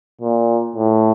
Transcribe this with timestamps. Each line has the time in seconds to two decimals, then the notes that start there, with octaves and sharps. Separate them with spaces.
0.21 A#2
0.76 A2